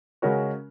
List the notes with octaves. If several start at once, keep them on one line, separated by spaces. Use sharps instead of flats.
C#3 G#3 C#4 F#4 A#4